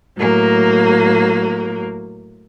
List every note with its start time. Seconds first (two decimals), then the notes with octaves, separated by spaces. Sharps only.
0.17 A2 F#3 A#3